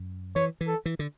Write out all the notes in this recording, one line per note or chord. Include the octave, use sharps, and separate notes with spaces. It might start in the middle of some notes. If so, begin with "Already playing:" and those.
Already playing: F#2
E3 C#5
E3
A4
E3
D3